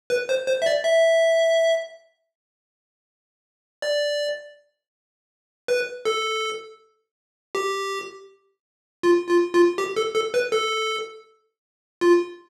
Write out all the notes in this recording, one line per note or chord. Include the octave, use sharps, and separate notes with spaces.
B4
C5
C5
E5
D5
E5
D5
B4
A4
G4
F4
F4
F4
G4
A4
A4
B4
A4
F4